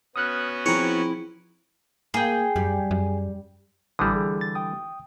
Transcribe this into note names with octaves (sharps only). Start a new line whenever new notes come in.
B3 C#4 F#4 D#6 F6 F#6
F3 C4 E4 G#4 C#5 A#5
A#3 G#4 G5
F#2 G3
F#2
A1 D3 E3 G3 D#6
G#4
A6
G5 D#6